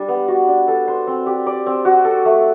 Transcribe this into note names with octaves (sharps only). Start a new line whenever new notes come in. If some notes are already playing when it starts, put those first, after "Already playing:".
Already playing: G3 D4
B3
F#4
D4
A4
C5
C4
G4
D5
C4
F#4
A4
A3